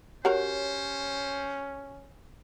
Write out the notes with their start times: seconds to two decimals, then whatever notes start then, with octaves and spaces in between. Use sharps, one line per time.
0.25 C#4 F#4 G4 A#4 C5 C#5